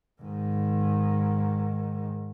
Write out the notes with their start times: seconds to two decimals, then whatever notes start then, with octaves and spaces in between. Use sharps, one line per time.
0.22 G#2 D#3